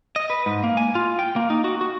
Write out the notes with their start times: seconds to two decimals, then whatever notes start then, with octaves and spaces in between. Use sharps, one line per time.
0.16 D#5
0.30 B4
0.46 G#2
0.64 A#3
0.77 G#5
0.95 F4
1.19 G5
1.36 A#3
1.50 D#4
1.64 F#4
1.81 F#4